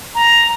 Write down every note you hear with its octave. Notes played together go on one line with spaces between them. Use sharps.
A#5